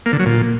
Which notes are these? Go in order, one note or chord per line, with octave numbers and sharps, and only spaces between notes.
A#3
D3
F#3
A#2